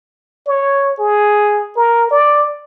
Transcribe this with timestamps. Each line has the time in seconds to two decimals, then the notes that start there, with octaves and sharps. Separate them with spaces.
0.47 C#5
0.99 G#4
1.76 A#4
2.11 D5